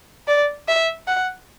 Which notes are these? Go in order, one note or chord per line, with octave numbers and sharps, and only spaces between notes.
D5
E5
F#5